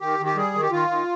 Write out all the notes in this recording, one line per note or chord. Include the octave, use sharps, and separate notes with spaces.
D#3 G4
D#3
G4
G3 G#4
D#3
G4
D#3 F4
D#3